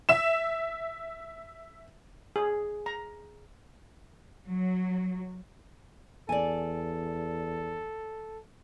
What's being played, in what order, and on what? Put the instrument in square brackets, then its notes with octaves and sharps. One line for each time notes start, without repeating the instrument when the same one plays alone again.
[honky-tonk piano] E5 E7
[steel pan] G#4
A#5
[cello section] F#3
[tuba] E2 [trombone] A4 [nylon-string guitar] D5 G#5